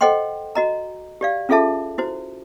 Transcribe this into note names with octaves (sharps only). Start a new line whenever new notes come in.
A4 C5 D#5 F#5 G5 C6
F#4 D#5 A#5
G4 D5 F5
C#4 F4 G#4 A4 E5 A5
E4 F#4 C5